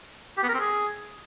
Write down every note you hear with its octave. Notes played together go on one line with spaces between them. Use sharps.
G4
B3
A#4
C4
G#4